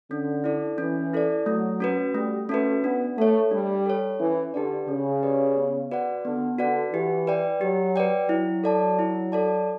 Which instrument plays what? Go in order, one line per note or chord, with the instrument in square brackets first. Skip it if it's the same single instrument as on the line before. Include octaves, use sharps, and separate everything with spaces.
[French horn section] D3 [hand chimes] C#4
[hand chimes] E4 A4 D5
[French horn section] E3 [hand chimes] C#4
[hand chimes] E4 A4 D5
[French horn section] F#3 [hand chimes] A3
[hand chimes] C#4 F#4 B4
[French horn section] G3 [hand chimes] A3
[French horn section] A3 [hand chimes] C#4 F#4 B4
[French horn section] B3 [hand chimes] D4
[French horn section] A3 [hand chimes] A4 C#5
[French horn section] G3 [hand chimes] D4
[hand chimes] A4 C#5
[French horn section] E3 [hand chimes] C#4
[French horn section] D3 [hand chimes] G4 B4 D5
[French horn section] C#3 [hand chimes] C#4
[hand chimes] G4 B4 D5
B3
F#4 B4 D5 F#5
[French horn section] D3 [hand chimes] B3
[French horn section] D3 [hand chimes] F#4 B4 D5 F#5
[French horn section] E3 [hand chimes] G4
[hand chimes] B4 D5 G5
[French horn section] F#3 [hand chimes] G4
[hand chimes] B4 D5 G5
[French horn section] F#3 [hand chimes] E4
[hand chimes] A4 D5 A5
E4
A4 D5 A5